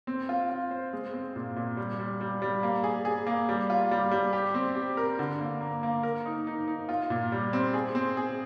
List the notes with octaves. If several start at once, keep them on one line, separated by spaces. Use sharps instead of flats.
C4
F4
F4
C5
G#3
C4
A#2
A#2
G3
G3
G3
G3
A#3
G#4
G#4
A#3
G3
F4
G3
G3
G4
C4
G4
A#4
D3
A#3
A#3
A#3
A#4
D#4
D#4
D#4
F4
A#2
G3
C4
G#4
C4
G#4